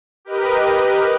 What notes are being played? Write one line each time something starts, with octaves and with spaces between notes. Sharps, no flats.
G4 A#4 B4 D#5